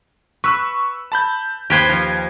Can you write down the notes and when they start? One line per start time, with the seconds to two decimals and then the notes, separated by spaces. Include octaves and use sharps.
0.44 B4 C#6 E6 F#6
1.12 A5 B5 G6
1.70 D#2 G4 B4 C5 G#6
1.89 F3